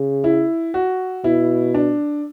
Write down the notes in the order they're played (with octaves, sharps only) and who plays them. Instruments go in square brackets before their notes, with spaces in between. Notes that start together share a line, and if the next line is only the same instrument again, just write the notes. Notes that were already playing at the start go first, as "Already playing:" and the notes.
Already playing: [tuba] C#3
[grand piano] E4
F#4
[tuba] B2 [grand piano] E4
[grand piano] D4